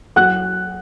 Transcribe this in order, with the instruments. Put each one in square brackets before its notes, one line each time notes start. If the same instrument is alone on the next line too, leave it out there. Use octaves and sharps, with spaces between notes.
[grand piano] F#3 F#5 F#6